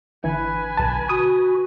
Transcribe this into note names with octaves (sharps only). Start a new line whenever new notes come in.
G#1 D3 E3 B4 G#5 G#6
B1 A5
F#4 D#6